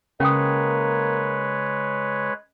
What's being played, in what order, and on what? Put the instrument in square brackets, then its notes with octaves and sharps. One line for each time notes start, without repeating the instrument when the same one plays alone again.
[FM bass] C#3 [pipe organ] G#3 B4 C#5 [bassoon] A#3 [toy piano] C#4 G5 D#6